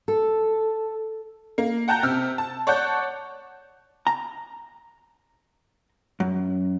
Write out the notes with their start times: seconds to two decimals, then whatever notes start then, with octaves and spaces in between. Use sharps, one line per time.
0.08 A4
1.58 A#3
1.88 F#5 G5 A5 A#5 G6
2.03 C3 E6 F6
2.38 A5
2.67 C#5 D5 F#5 A5 G6
4.07 A#5
6.20 F#2